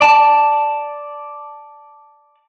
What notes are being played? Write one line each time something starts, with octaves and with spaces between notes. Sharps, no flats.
D5 A5